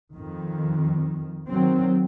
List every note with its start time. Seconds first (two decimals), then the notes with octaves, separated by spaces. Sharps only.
0.13 F2 D#3
1.49 D#3 F#3 C4